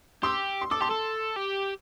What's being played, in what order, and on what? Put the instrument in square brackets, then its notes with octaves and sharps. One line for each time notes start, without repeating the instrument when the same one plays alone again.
[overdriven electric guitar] G4 [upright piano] C6 E6
[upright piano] C6
[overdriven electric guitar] A4 [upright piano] D6
[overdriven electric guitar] G4 [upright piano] A5 C6
[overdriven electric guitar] A4
G4